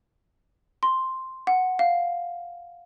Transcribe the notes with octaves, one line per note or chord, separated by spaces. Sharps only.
C6
F#5
F5